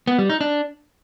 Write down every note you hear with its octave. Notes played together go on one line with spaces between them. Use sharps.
B3
G3
D#4
D4